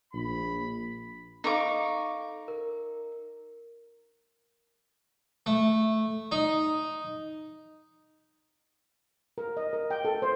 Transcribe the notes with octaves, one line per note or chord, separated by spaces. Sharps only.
A#1 B5
D#4 A4 F5 C#6 D6
A#4
A3
D#4
A#4
D#5
A#4
G5
A4
C5